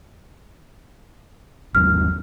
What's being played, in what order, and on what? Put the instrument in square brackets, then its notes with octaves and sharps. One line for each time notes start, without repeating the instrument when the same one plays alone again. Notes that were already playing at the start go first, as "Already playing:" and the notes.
[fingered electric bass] G1 D#2 F#3 [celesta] F6